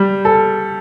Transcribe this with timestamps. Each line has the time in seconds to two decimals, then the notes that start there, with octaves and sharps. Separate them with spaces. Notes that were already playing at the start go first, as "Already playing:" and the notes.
Already playing: G3
0.25 A4